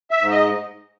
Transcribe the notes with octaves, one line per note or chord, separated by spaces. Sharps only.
E5
G#2
D#5